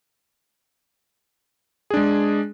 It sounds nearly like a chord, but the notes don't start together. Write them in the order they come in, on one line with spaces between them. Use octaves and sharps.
G#4 D4 G#3